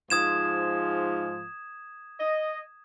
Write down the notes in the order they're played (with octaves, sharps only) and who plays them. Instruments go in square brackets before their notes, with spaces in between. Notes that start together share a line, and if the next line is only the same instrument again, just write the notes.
[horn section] G#2 F3 [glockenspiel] D#6 G#6 E7
[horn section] D#5